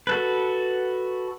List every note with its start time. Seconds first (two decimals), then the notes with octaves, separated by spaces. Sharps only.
0.07 F#4 A4 B4